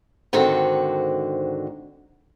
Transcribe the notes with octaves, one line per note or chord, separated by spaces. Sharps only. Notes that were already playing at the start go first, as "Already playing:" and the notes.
G#2 D3 D#3 C4 F#4